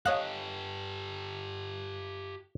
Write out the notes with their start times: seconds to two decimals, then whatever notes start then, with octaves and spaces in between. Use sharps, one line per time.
0.06 G4 A4 C#5 D#5 F5 F#6